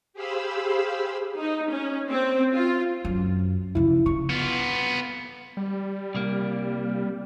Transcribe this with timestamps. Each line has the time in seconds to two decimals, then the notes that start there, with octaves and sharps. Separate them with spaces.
0.13 G4 G#4 C5 F5 B5 E6
1.38 D#4
1.68 C#4
2.10 C4
2.53 F4
3.05 F#2
3.75 C#3 F3 E4
4.06 C#3 C#6
4.30 B3 F4
5.57 G3
6.15 C2 A#3